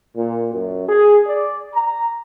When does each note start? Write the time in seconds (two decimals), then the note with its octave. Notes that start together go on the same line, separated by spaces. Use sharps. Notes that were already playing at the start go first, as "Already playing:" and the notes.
0.15 A#2
0.52 F#2
0.87 G#4
1.27 D5
1.73 A#5